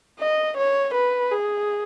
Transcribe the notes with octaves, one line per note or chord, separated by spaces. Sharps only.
D#5
C#5
B4
G#4